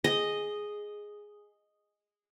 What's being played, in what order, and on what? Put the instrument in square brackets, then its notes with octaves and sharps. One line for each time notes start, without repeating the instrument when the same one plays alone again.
[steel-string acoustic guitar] G#4 [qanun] D#5